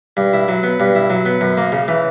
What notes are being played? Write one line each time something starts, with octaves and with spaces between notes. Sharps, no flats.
G2
E4
F#3
B3
G2
E4
F#3
B3
F#2
A#3
C#3
E3